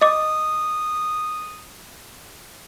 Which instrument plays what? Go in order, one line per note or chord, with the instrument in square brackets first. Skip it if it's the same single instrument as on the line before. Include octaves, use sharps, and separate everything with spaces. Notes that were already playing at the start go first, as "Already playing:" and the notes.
[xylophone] D#5 D6 [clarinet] D#6